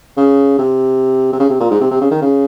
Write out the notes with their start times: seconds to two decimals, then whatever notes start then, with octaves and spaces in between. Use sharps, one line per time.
0.17 C#3
0.58 C3
1.33 C3
1.40 C#3
1.50 C3
1.60 A#2
1.71 G#2
1.81 C3
1.91 C3
2.01 C#3
2.11 D#3
2.21 C#3